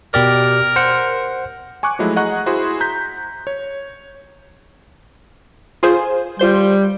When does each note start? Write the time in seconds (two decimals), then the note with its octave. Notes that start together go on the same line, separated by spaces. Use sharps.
0.14 B2 G4 A#4 D5
0.76 C5 F#5 C#7
1.83 G#5 C#6 D6 F#6
1.99 F3 F#3 G#3 A3 E4
2.16 G#4 D#5 F#5 A#5 C#6 F#6
2.46 E4 F#4 G#4 C5 C6
2.80 A#5 G6 B6
3.47 C#5
5.83 F4 G#4 C5
6.39 G3 F4 C5 G6